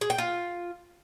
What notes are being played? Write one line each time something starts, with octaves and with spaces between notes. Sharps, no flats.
G#4
G5
F4